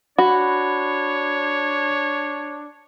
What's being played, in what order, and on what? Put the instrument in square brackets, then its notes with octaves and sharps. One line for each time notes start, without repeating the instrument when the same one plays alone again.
[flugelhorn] D4 [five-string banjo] F#4 [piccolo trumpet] C#5 [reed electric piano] B5